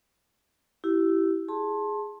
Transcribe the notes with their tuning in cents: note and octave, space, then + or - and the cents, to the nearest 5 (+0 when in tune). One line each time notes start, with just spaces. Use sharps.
E4 +0 G4 -25
G#4 +0 A5 +0 C6 +25